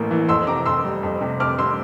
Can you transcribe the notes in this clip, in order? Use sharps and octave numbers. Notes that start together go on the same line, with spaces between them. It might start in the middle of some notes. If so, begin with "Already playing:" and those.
Already playing: A1 A2 E3 A#3
E3
F2 C6 E6
C3 A#5 D6
F2 C6 E6
G3
F2
C3
F2 D6 F6
G3 C6 E6